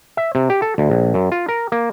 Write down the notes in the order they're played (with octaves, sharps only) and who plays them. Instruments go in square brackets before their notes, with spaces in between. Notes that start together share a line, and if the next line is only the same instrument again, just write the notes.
[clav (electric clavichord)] E5
C3
G4
A4
D2
A#1
F#2
F4
A#4
A#3